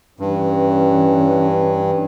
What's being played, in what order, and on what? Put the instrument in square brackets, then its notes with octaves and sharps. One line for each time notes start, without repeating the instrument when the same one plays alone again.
[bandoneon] G2 [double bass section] E3 C#4